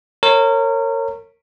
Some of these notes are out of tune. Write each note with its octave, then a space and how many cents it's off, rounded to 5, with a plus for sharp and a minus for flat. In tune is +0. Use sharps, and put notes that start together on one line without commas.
A#4 -30 C#5 -20